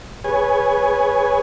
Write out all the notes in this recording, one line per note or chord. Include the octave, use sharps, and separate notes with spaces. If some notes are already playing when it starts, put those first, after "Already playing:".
G#4 B4 C#5 G#5